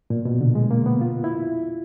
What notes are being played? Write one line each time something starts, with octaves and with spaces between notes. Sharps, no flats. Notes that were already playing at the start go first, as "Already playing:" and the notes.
A#2
B2
D3
G#3
A#3
B3
F4
E4